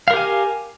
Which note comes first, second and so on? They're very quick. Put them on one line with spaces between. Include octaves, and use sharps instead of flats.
F5 A#4 G4 G#5